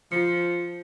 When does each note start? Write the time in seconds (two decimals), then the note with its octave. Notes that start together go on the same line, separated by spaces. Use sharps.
0.12 F3 F4 C#7